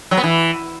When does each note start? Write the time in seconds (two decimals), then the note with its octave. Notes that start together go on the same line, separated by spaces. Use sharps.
0.11 F#3
0.17 B3
0.24 E3